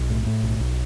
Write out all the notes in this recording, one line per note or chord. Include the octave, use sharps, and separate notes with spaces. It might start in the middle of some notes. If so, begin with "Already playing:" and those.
Already playing: B1
A2
A2
B1
B1